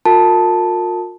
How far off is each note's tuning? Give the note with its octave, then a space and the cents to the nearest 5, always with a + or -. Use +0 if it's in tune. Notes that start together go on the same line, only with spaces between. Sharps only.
F4 +45 A#4 -25 A5 +0